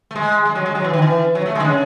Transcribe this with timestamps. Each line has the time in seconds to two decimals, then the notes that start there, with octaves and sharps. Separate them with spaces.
0.11 A3
0.15 G#3
0.45 G#3
0.55 F#3
0.66 G#3
0.75 F#3
0.84 E3
0.93 D#3
1.02 E3
1.35 F#3
1.46 A3
1.55 G#3
1.60 D#3
1.65 C#3